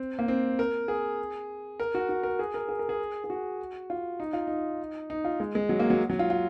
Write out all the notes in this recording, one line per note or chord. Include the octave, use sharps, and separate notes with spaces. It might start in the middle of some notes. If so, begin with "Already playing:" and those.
Already playing: C4
A#3
C4
A#4
G#4
A#4
F#4
F#4
A#4
G#4
A#4
G#4
A#4
G#4
G#4
F#4
F4
D#4
F4
D#4
D#4
F4
G#3
G#3
F#3
A#3
F#3
F#3
F4
F4